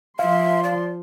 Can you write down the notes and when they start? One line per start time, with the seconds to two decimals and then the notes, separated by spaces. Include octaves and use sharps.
0.19 F3 E5 F5 C6
0.64 D5